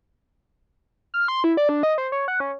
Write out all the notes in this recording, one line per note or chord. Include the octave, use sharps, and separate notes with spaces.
F6
C6
E4
D5
D4
D#5
C5
C#5
F#5
C#4